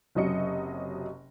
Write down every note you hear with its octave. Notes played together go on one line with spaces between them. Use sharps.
F#1 C3 F#3 D#5 C#7